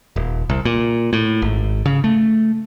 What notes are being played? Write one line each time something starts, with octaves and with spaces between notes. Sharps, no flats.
D#1
C2
A#2
A2
G#1
C#3
A3